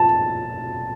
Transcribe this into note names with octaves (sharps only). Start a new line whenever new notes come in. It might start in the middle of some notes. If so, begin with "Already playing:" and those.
Already playing: A5